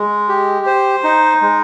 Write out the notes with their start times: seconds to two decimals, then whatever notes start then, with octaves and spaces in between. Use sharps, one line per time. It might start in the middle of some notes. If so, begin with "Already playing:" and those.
Already playing: G#3
0.29 G4
0.66 C5
1.04 D#4
1.41 G#3